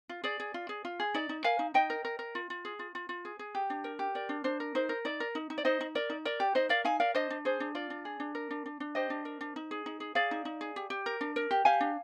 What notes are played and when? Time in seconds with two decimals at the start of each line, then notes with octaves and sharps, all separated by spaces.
0.09 F4
0.24 G#4 D5
0.40 G#4
0.54 F4
0.69 G#4
0.85 F4
1.00 G#4
1.14 D#4 D5
1.29 D#4
1.44 A#4 F5 G#5
1.59 D#4
1.74 D#4 D#5 G5
1.90 A#4
2.05 A#4
2.19 A#4
2.35 F4
2.50 F4
2.65 G#4
2.79 F4
2.95 F4
3.09 F4
3.25 G#4
3.39 G#4
3.55 G4
3.70 D4
3.84 A#4
3.99 G4
4.15 A#4 D5
4.29 D4
4.44 D4 C5
4.60 A#4
4.75 D#4 C5
4.89 A#4
5.05 D#4 D5
5.20 A#4
5.35 D#4
5.50 D#4
5.58 D5
5.65 D#4 C5 D#5
5.81 D#4
5.95 A#4 D5
6.10 D#4
6.25 A#4 D5
6.40 G4
6.55 D#4 C5 D#5
6.69 A#4 D5 F5
6.85 D#4 F5 G#5
7.00 A#4 D5 F5
7.15 D4 C5 D#5
7.30 D4
7.45 G#4 C5
7.60 D4
7.75 F4 D5
7.90 D4
8.05 G#4
8.20 D4
8.35 A#4
8.51 D4
8.66 D4
8.80 D4
8.95 G4 C5 D#5
9.10 D4
9.25 A#4
9.41 D4
9.56 D#4
9.71 G#4
9.86 D#4
10.00 G#4
10.15 G#4 D5 F5
10.31 D#4
10.45 D#4
10.61 G#4
10.76 G4
10.90 G4
11.06 A#4
11.21 D4
11.36 A#4
11.51 G4
11.65 G4 F5 G#5
11.81 D4